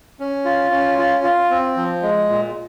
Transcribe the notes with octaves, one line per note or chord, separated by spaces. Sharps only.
C#4
F4
C#4
F4
F4
C4
F3
G#3
A#2